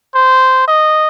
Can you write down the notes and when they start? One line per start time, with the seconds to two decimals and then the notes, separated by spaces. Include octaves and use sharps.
0.15 C5
0.68 D#5